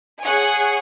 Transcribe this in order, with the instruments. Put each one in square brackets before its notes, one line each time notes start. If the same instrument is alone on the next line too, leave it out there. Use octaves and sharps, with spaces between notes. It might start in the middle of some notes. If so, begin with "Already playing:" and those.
[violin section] G#4 C#5 F#5 G#5